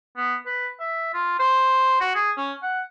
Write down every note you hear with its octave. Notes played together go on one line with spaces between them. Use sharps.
B3
B4
E5
F4
C5
F#4
G#4
C#4
F#5